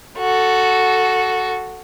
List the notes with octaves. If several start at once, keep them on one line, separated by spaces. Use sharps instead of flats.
F#4 A4